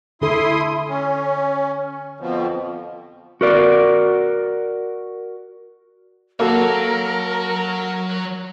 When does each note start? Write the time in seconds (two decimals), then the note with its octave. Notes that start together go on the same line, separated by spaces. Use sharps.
0.22 D3 E4 A4 C6 D#6
0.88 C#4
2.20 F2 B2 F3
3.41 F#4 A#4 D5
6.40 F#3 A#3 F#4 A4 A#4 C#5